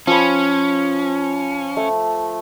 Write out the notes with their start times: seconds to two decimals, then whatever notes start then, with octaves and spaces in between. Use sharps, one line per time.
0.07 F3 C#4 B5
1.77 A3